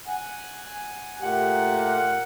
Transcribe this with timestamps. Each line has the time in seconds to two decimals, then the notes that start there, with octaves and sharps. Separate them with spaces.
0.08 F#5 G#5
1.21 A#2 A3 G4 F#5